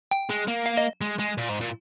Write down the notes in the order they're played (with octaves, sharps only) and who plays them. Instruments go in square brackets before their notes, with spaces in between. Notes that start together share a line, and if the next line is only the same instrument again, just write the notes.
[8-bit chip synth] G5
[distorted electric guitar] G#3
A#3
[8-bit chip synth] F5
D#5
[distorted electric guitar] G#3
G#3
A#2
G#2
A#2